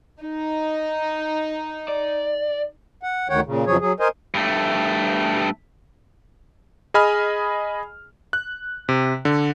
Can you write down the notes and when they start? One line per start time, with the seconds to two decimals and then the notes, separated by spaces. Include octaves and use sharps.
0.22 D#4
1.88 D5
3.03 F#5
3.30 D2 D#3 C#5 F#5 G5
3.45 A#2 C#3
3.66 F2 C#3 F3 F#3 G#4 C#5
3.81 F#3 G#4
4.00 A#4 C5 D#5 G#5
4.34 G2 A3
6.94 G#4 D#5 G#5 B5 F6
8.33 F#6
8.89 C3
9.25 D3